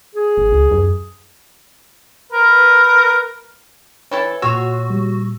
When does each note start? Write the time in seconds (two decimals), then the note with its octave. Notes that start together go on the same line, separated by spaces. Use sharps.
0.15 G#4
0.37 G#1
0.52 C#2
0.71 F#2
2.32 A#4 B4
4.11 E3 E4 A4 C#5 G#6
4.42 A#2 F#4 C#5 F#5 C6 E6
4.90 G3